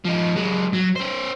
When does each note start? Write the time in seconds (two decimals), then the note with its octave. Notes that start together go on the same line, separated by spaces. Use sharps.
0.05 F3 D#4
0.36 F#3 G#3
0.73 F#3
0.96 C#4 C5